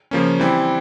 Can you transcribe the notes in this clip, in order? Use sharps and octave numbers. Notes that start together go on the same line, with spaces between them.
C#3 F3 A#3 C#4
E3 G3 C4 E4